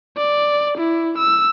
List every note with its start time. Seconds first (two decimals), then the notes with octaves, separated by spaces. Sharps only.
0.17 D5
0.78 E4
1.18 E6